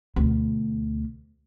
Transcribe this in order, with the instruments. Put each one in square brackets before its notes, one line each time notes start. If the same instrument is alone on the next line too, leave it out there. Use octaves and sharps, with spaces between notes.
[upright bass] D2 B2